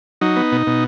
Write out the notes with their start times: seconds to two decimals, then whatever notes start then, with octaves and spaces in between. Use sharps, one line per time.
0.21 F#3 D#4
0.36 B3
0.52 B2
0.67 B2